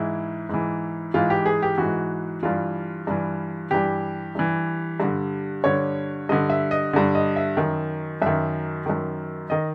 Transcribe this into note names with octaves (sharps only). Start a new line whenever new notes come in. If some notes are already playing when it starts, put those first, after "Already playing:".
Already playing: G#2 E3 E4
G#2 E3
G#2 E3 F4
G4
G#4
G4
G#2 E3 F#4
G2 E3 F4
G2 E3
G2 E3 G4
G2 E3
G2 D3
G2 D3 C#5
G2 D3 D#5
E5
D#5
G2 D3
D#5
E5
F#2 D#3
F#2 D#3 E5
F#2 D#3
D#3 D#5